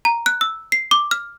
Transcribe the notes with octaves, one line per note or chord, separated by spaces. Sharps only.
A#5
F#6
E6
C7
D6
F6